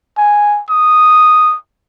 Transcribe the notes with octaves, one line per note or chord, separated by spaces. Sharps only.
G#5
D#6